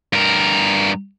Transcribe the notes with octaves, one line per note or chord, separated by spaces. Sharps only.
G2 A#4